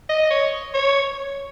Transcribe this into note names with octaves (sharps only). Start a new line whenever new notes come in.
D#5
C#5
C#5